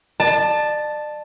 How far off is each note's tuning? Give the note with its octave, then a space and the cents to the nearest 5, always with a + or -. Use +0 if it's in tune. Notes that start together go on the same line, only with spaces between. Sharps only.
D5 +40 A5 +0